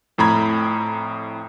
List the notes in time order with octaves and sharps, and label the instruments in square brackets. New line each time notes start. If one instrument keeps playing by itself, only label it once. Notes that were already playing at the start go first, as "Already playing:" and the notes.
[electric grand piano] F2 A2 A#5 B5 G#6